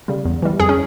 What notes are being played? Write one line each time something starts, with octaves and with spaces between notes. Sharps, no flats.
C#3 G3
E2
E3 G3
F2 G#4
C#4